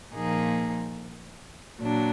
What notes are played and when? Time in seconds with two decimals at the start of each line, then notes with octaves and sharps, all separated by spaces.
0.14 A#2 F3 A#3 D#4 G#4
1.81 A#2 F#3 D4